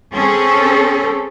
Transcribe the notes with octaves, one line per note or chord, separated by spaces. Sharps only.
C4 C#4 G#4 A4